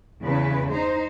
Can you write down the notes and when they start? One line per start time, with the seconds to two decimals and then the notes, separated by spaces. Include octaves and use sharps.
0.23 E2 C#3 B4
0.69 D#4 C5